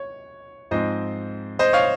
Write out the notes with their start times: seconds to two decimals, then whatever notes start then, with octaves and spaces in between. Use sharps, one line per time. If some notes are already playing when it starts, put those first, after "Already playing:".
Already playing: C#5
0.71 G#2 F3 C4 C5 D#5
1.59 C5 D#5
1.73 C#5 F5